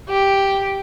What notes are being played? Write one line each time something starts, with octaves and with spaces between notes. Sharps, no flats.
G4